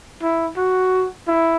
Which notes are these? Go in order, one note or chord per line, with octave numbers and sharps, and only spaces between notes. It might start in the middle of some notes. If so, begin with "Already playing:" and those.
E4
F#4
E4